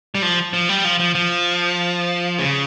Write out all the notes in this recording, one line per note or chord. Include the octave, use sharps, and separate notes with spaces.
G3
F3
F3
G3
F3
F3
F3
C#3